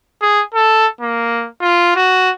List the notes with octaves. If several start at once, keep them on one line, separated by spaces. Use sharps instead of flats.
G#4
A4
A#3
F4
F#4